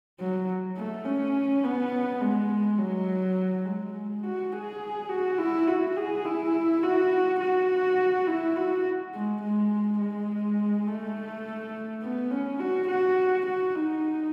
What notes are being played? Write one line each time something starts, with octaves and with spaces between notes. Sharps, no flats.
F#3
A3
C#4
B3
G#3
F#3
G#3
F#4
G#4
F#4
E4
F#4
G#4
E4
F#4
F#4
E4
F#4
G#3
G#3
G#3
A3
B3
C#4
F#4
F#4
F#4
D#4